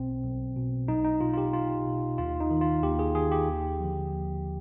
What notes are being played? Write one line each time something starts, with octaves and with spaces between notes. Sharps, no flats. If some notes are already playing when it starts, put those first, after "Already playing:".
Already playing: B1 B2 C4
B1
B2
B1 D#4
D#4
B2 F4
F4
G4
B1 F4
B2
D#2 F4
D#4
D#3
F4
D#2 G4
G#4
D#3 G#4
G4
D#2
D3 F3
D#2